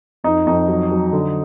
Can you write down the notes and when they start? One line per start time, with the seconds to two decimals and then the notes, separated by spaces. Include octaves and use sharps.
0.24 F2 D#4
0.46 F2 D#4
0.68 F#3
0.91 F#3
1.12 D3